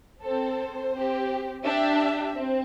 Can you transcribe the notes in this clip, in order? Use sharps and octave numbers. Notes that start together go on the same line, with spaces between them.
C4 A4 C5
C4 G4
D4 G4 E5
C4